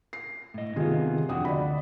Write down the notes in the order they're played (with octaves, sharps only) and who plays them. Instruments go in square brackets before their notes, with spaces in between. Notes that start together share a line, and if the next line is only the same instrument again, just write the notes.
[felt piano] C7
[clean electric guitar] A2 D#5
[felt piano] C3 F4 G#4 [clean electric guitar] D#3 B3
[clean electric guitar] F2 D4 F#4 [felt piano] F#5 G5 D#6
[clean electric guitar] D2 [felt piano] D5 D#5 B5